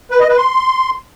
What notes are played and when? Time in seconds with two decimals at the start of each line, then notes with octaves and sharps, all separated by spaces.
0.11 B4
0.20 D#5
0.28 B4
0.37 C6